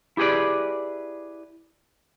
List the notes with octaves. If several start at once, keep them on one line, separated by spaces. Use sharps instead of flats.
E4 G4 G#4 B4 D5